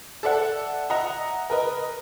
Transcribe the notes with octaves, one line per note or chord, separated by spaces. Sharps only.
A4 D5 E5 F#5
D#5 E5 F#5 A#5
A#4 B4 D#5